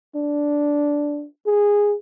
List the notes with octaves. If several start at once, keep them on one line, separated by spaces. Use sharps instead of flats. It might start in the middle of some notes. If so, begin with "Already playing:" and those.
D4
G#4